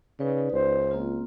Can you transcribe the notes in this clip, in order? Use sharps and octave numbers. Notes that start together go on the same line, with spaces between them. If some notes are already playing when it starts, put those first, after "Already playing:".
C#3 D#4 B4 D5
C#2 C5
A#3 C4 F4